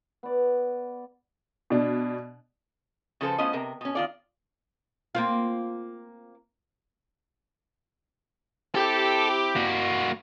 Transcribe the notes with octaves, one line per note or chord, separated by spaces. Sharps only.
B3 D5
B2 D4
C#3 F3 A4 B4 C5
A2 B3 C#4 F4 C5 D#5
C3 A#4
B2 C#4
D#3 F4 D5
A#3 C4 F4
C4 E4 G4 A4
A#3 F#4